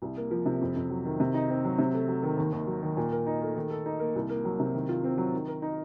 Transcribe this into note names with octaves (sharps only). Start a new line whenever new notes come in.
C2
A#3
F3
C3
F2
F2
F#3
D#3
C3
D#4
C4
F#3
C3
A3
F#3
D#3
D#2
D#2
F#3
D#3
A#2
A#4
D#4
A3
D#3
A4
D#4
A#3
C2
A#3
F#3
C3
D#3
F4
C4
F#3
D#3
A#4
D#4